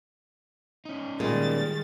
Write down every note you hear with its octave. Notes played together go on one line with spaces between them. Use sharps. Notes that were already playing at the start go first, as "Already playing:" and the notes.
C#4 D#4
A#2 D#3 G3 G#3 A6